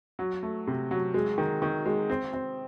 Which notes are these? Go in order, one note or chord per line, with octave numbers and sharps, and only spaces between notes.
F#3
A3
C3
F#3
G#3
D#3
D#3
G#3
C4
C4